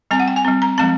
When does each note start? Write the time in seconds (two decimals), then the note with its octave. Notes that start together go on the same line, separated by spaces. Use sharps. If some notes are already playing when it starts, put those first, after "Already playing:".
0.11 G3 C4 G#5
0.19 F#5
0.28 G5
0.36 G#5
0.44 G3 C4
0.62 A#5
0.78 F3 G#3 C4 A5